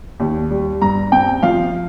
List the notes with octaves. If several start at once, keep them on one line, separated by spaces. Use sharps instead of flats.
D#2
G3
G2 A#5
C4 G5
F3 F5